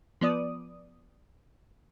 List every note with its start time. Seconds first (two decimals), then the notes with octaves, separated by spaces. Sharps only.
0.21 F3 B3 D5 D#6